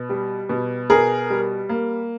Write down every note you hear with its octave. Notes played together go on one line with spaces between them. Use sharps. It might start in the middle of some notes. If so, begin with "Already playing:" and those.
Already playing: B2
G3
B2
B2 G#4 A#4
G3
A#3